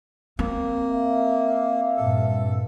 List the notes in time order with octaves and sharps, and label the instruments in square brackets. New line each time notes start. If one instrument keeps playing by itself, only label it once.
[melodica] A#3 [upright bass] C4
[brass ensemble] E5 F5
[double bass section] G2 A#2 [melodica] A4